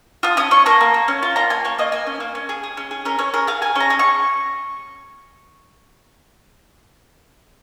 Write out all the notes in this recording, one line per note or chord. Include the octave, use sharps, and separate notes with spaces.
F4 D#6
C#4 D#6
C#4 C#6
A#3 A#5
A#3
A#3
C#4
F4
A#3 A#5
A#3 G#5
A#3 C#5
A#3 D#5
A#3 G#5
C#4
A#3
C#4
G#4
G#4
C#4
G#4
C#4 A#4
C#4 C#5
G#4 A#4
G#4 F5
G#4 G#5
C#4 A#5
G#4
C#6